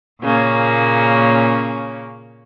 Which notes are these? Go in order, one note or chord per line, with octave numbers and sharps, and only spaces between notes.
A#2 C#3 A#3 C#4